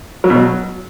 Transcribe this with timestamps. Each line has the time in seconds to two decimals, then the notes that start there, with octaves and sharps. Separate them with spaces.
0.24 F#3
0.30 B2
0.36 F#3